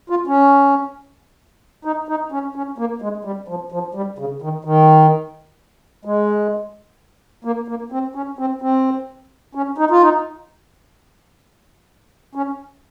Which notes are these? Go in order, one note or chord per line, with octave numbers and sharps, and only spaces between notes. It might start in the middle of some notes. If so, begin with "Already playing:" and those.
F4
C#4
D#4
D#4
C#4
C#4
A#3
G#3
G3
F3
F3
G3
C#3
D#3
D#3
G#3
A#3
A#3
C4
C#4
C4
C4
C#4
D#4
F4
D#4
C#4